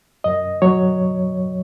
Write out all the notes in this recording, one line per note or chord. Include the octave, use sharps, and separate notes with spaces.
F#2 D#5
F#3 C#5